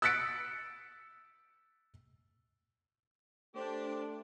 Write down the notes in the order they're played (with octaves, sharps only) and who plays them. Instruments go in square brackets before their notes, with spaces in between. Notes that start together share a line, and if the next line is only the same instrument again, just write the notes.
[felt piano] E6 F#6 A6 B6 C#7 D7
[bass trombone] A3 [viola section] D4 [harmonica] G4 D5 [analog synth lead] C5